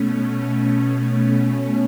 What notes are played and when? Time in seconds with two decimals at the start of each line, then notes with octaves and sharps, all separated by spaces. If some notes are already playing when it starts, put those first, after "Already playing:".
Already playing: B2 A3 C#4